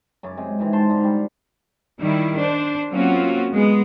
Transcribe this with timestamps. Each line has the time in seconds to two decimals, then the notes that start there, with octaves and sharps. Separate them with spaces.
0.23 F#2 C#3 D6
0.37 C3 G#3
0.58 C3 D#3 E3 G#3
0.73 F4 C5 A5 C6
0.90 G#2 D3
1.04 G3
1.99 D#3 G3 E4
2.37 D4 C5
2.91 F#3 A#3 C4 C#4 F4 F#4
3.53 G#3 B3